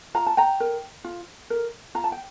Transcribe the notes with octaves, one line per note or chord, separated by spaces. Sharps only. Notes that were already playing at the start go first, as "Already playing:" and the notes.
F4 A#5
A5
G5 A#5
A#4
F4
A#4
F4 A#5
A5
G5